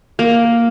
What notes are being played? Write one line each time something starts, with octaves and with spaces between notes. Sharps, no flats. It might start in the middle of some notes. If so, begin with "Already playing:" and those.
A#3